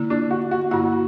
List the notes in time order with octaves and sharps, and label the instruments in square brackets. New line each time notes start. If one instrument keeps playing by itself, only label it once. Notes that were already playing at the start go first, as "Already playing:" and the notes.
Already playing: [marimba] D3 A#3 E4
[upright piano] D4
F#4
F#4
[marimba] G2 D3 A#3 E4 [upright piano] F#4